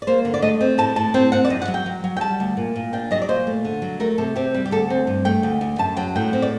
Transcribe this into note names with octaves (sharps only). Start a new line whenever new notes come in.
D5
A#3 C5
D3
D5
A3 D#5
C4
A2 A5
A2 A5
C4 G5
C4 F#5
D5
F#2 D#5
F#5
F#3
G5
F#3
F#3
G5
G3 A5
D2
A#2
A#2
D4 G5
F#3 D#5
D5
A#2 C5
A3
D3
F#3
A3 A#4
C3 A4
C4 G4
G3
G4
D2 A4
C4
G2
A3 G5
D2
D2
F#2 A5
F#3 G5
A2 G5
C4
D5